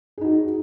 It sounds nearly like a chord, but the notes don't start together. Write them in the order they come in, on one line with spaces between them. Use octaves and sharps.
G#4 D#4 F#4